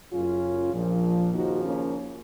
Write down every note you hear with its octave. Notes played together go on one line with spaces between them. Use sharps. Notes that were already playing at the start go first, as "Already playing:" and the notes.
F#1 F#2 C#3 C#4 F4
A#1 A#2 F3
D#2 C#3 F3 D#4 F#4
A#3 C#4